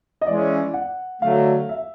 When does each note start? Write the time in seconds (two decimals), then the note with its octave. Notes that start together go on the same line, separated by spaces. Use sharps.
0.21 D#5
0.27 E3 G#3 C#4 D5
0.74 F#5
1.22 D3 F#3 A3 F5
1.69 E5